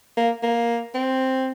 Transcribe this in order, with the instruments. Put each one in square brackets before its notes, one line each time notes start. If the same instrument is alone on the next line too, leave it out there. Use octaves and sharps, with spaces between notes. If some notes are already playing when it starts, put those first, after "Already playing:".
[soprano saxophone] A#3
A#3
C4